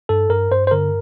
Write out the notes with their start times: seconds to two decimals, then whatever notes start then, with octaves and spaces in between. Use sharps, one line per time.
0.09 G2 A4
0.30 G2 A#4
0.51 G2 C5
0.67 C5
0.71 D3 A#4